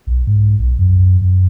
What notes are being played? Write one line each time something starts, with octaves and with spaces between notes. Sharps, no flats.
B1
G#2
B1
F#2
F#2